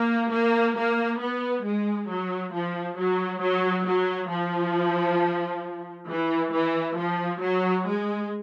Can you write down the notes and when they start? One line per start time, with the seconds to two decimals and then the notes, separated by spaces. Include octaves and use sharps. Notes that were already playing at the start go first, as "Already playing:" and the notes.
Already playing: A#3
0.31 A#3
0.76 A#3
1.20 B3
1.64 G#3
2.09 F#3
2.54 F3
2.97 F#3
3.41 F#3
3.86 F#3
4.30 F3
6.08 E3
6.52 E3
6.96 F3
7.42 F#3
7.86 G#3